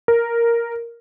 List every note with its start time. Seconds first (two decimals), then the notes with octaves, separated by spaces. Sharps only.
0.08 A#4